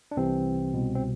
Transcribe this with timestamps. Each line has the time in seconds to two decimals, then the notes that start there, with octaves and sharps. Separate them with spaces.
0.11 D4
0.17 C2 C3 E3 C4
0.74 C2 B2
0.95 C4